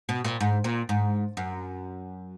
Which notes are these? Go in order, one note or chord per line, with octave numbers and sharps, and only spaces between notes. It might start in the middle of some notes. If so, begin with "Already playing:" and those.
B2
A#2
G#2
A#2
G#2
F#2